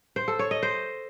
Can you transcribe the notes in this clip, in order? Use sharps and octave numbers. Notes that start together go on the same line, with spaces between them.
C5
A4
C#5
D#5
C5